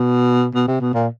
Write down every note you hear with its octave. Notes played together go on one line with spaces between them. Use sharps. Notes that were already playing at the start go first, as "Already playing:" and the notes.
Already playing: B2
B2
C3
B2
A#2